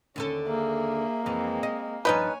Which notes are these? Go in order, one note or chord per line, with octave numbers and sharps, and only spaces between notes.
D#2 D3 C#4 A4
A#3 G#4 E5
F2 E3 G#3 C4
D#5
G2 F3 C#4 D#4 B4 C#5 G#5